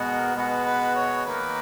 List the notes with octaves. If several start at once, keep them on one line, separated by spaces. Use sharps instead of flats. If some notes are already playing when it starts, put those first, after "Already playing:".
Already playing: B2 G#3 B3 F#4
A#4
B2 G#3 B3 F#4 B4
B4
C#5
D#3 A#3 D#4 A#4 B4